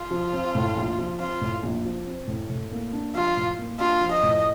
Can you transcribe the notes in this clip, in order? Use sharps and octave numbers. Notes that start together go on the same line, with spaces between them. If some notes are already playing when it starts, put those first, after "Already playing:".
Already playing: F4
F3
C4
A2
A#1
F3
C4 F4
A2
A#1
F3
C4
A2
A2
A#3
D4
F3 F4
A2
A#3
D4 F4
F3
D#5
A2